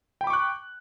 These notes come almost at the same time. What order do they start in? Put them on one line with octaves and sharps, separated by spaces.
G5 B5 D6 C#6 F#6